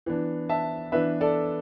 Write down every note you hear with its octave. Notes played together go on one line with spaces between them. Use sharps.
E3 B3 D4
E5 A5
E3 B3 D4 B4 E5
A4 D5